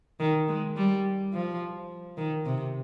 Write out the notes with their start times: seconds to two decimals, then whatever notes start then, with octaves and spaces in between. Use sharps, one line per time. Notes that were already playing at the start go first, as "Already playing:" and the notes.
0.20 D#3
0.48 G#3
0.76 G3
1.33 F3
2.17 D#3
2.45 C3